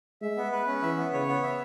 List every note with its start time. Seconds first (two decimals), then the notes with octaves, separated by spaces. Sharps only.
0.22 G#3 E5
0.37 B3
0.52 B4
0.67 C#4
0.82 E3 E5
0.97 B3
1.13 C#3 C#5
1.28 B3
1.43 E5